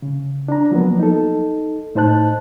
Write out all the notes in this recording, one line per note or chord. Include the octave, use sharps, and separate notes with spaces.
C#3
D4 A#5
F3 F#3 A#3 B3
D#4 A4
A2 D#4 C5 A5 F#6